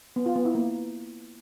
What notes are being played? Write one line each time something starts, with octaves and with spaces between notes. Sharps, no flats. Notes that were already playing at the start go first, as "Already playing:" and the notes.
B3
F4
B3
E4
A#3